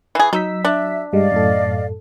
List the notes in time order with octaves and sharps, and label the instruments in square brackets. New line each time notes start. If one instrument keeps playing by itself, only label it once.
[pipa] E3 G#4 [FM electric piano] G#5 C7
[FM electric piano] F#3 E6 B6 [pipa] D#4
[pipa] D4 [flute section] E5
[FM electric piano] G2 G3 G#3 [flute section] D5 D#5 F5
[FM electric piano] F#2 A2 A4